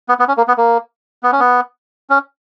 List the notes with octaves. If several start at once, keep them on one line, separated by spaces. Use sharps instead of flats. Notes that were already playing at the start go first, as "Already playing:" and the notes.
B3
B3
C#4
A#3
B3
A#3
B3
C#4
B3
C#4